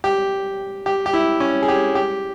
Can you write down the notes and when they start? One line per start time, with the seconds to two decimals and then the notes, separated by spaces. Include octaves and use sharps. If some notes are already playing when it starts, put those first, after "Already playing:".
0.04 G4
0.86 G4
1.06 G4
1.13 E4
1.40 C#4
1.63 G#4
1.68 G4
1.95 G4